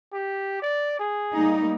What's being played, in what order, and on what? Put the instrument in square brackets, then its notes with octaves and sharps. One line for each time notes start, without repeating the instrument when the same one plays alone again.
[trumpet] G4
D5
G#4
[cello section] G3 A#3 D#4